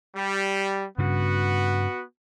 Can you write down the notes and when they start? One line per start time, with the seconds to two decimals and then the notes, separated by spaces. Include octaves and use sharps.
0.15 G3
0.98 G2 C#3 B3 F#4